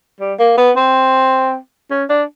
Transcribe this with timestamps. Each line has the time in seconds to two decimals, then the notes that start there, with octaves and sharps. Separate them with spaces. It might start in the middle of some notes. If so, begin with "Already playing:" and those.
0.20 G3
0.39 A#3
0.58 B3
0.77 C4
1.90 C#4
2.09 D4